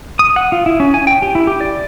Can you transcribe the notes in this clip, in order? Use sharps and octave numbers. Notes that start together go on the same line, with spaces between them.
D#6
F#5
F4
E4
C#4
G#5
G5
G4
E4
G4
D5